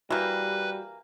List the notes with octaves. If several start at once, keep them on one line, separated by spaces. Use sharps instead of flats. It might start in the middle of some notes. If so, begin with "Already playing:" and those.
E3 G3 A#3 F#4 G4 B4